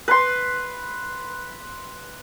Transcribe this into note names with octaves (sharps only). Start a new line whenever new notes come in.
B4 C6